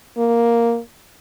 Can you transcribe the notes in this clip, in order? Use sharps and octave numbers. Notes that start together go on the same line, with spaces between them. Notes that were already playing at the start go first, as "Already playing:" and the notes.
A#3